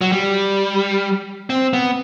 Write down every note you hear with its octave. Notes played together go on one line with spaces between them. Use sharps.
F#3
G3
C4
B3